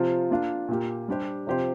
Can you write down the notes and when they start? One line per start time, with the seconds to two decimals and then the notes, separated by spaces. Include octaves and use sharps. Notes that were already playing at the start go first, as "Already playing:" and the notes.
Already playing: C3 F3 C4 F4
0.31 A#3 D4 F4
0.69 A#2 A#3 G4
1.08 G3 D4 G4 C5
1.47 C3 F3 C4 G4 C5